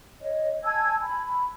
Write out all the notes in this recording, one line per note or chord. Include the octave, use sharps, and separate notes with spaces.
C#5 D#5
G#5 A5 E6 G#6
B5